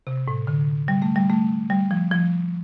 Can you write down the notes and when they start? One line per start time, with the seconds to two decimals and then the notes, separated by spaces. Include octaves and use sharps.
0.07 C3
0.28 A2
0.47 D3
0.88 G3
1.02 A3
1.16 G3
1.30 A3
1.70 G3
1.91 F3
2.11 F3